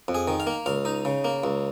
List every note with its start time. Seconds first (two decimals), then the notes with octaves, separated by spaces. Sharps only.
0.08 F2
0.15 G#4
0.28 D#3
0.40 F5
0.47 A#3
0.66 C#2 F5
0.85 D#4
1.05 C#3
1.24 A#3
1.44 C#2